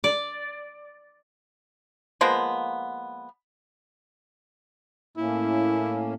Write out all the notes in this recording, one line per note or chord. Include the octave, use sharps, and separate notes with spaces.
D5
F3 G#3 A#3 B3
A2 A#3 C#4 E4